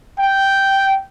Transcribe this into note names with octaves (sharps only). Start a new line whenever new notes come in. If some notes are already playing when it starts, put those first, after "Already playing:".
G5